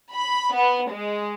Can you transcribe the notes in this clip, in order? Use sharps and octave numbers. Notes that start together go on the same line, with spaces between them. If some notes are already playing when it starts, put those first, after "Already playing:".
B5
B3
G#3